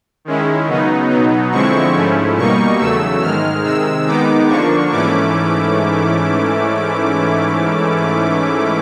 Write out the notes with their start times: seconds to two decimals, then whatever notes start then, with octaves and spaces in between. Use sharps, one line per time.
0.25 D#3 G#3 C#4 E4
0.68 C#3 F#3 B3 D#4
1.10 B2 F#3 B3 D#4
1.52 D3 F3 G#3 C4 E4 C#6
1.94 G#2 F3 A3 C#4 E4
2.37 B2 G3 A#3 D#4 C#6
2.79 E2 C#3 F#3 A3 E6
3.21 G#2 D#3 G#3 F6
3.64 C3 D#3 G#3 E6
4.06 D#3 G#3 B3 D#4 D6
4.48 D3 F3 A#3 D4 C#6
4.91 G#2 E3 A3 C#4 E4 D6